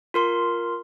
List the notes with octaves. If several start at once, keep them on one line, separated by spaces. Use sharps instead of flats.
F4 A#4 C6